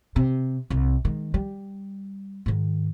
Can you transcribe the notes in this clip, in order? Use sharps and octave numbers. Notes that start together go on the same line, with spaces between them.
C3
C2
D#3 G#3
G3
G#2 D#3